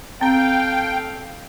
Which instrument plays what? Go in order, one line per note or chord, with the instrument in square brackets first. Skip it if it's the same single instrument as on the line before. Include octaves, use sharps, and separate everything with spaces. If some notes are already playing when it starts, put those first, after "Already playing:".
[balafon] C4 A#5 [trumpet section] A4 F5 [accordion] G5